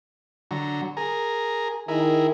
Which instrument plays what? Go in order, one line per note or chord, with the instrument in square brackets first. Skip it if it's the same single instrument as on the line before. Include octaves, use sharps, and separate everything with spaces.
[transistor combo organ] D3 F#3 A#5
G#4 A#4 A#5
[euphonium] D#3 [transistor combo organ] E4 G#4 A#4